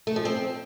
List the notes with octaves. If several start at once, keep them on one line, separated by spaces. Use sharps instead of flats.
A3
F3
C4